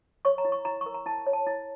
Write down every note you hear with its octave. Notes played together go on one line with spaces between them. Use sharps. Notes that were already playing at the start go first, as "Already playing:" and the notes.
C#5 C#6
A#5
E4
C#6
E4 A#5
C#6
A#4
A#5
E4 A5
C#5
A5
E4